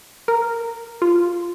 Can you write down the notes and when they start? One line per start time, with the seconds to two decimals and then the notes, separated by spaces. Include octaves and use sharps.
0.28 A#4
1.02 F4